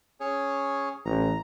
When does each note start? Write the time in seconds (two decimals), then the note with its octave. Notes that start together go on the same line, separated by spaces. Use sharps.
0.20 C#4 G#4 C#5
1.06 A1 A#5